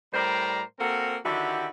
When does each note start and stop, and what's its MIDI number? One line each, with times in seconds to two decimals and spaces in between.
0.13 0.61 45
0.13 0.61 55
0.13 0.61 70
0.13 0.61 72
0.13 0.61 74
0.13 0.61 82
0.79 1.17 58
0.79 1.17 60
0.79 1.17 66
0.79 1.17 69
0.79 1.17 70
1.24 1.67 50
1.24 1.67 51
1.24 1.67 64
1.24 1.67 66
1.24 1.67 67